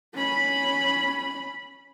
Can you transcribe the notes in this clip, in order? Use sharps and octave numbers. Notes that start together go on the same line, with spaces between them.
C#4 B5